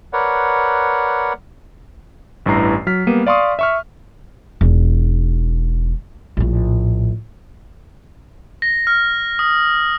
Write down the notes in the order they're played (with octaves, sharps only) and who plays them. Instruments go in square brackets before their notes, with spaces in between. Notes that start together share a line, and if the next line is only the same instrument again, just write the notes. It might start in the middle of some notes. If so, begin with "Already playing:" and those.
[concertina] A#4 B4 C#5 D5 F#5
[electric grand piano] A1 G2 E3 A#5 C7
F#3 F6 B6
G3 A#3 B3 D#7
D5 F5 C6 C#6 D#6
E5 C#6 F6
[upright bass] E1 D#4
A#1 A2
[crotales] A#6
F6
D#6